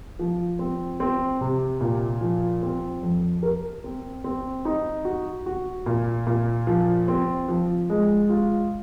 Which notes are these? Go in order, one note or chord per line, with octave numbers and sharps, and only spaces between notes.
F3
C4
C4
C3
A#2
F3
C4
F2
A#4
C4
C4
D#4
F#4
F#4
A#2
A#2
F3
C4
F3
G#3
F4